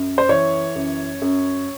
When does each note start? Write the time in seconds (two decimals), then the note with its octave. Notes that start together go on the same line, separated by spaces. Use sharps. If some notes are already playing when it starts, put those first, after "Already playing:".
Already playing: F#2
0.18 C5
0.29 E3 C#5
0.75 F#2
1.22 F#2